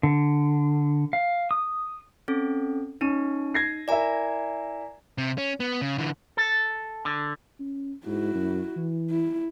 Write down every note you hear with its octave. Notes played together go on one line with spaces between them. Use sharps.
D3
F5
D#6
C4 C#4 A4
C#4 D#4 D#7
G#6 A#6 C7
E4 A#4 D5 E5 G#5 A#5
C3
C#4
B3
C#3
D3 E3
A4
D3
C#4
G#2 E4 F#4
F#2
E3
E4